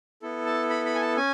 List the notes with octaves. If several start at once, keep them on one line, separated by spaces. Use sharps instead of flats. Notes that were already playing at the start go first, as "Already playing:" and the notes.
B3 E4 A4
A5
B5
B5
G#5
A5
C#4 G#5